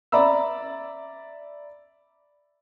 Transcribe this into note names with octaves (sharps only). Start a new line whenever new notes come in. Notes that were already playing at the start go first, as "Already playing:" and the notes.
D5 E5 A#5 B5 E6